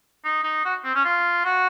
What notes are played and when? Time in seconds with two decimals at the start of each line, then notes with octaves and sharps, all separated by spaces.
0.25 D#4
0.44 D#4
0.65 F#4
0.84 C4
0.95 C#4
1.05 F4
1.45 F#4